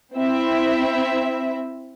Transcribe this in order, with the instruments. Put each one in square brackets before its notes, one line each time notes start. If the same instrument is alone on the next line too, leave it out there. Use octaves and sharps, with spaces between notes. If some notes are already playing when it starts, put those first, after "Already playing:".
[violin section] C4 E4 E5